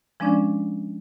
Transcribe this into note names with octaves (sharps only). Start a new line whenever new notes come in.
F3 G#3 C#4 D4 D5